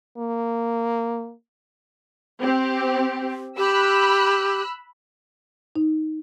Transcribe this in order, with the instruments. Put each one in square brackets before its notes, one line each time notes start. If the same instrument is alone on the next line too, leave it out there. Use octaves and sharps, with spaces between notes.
[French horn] A#3
[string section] C4 G4
[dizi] G4 [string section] B5 E6 F#6
[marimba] D#4